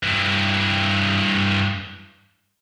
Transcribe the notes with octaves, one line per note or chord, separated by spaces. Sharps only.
G2 E3